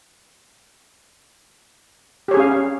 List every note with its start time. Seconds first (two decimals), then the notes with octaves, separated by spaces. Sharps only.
2.28 G4
2.31 C#5
2.34 G#4
2.37 C#4
2.40 F5